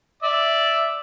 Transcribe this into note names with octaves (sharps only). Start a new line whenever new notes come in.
D5 E5